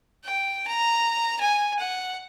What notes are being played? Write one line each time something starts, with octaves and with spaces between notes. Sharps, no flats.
G5
A#5
G#5
F#5